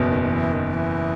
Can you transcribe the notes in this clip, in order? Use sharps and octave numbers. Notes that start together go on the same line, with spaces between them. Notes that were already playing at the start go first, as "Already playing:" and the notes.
Already playing: F#1 E2 B2
D#3
D#3
E3
D#3
E3